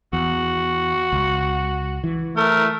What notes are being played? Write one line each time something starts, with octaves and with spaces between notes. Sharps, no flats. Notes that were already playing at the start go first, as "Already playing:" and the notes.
E2 F#4
C#2
E3
A3 A#4